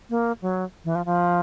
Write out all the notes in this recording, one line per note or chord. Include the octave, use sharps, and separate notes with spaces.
A#3
F#3
E3
F3
F3